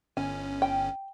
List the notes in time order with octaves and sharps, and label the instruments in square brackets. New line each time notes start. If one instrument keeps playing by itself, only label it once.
[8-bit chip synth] G1 C#4 [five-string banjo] G#5
[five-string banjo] G5